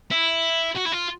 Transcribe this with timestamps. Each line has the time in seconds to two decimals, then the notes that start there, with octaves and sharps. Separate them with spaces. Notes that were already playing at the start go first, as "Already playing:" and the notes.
0.11 E4
0.75 F#4
0.85 E4
0.92 F4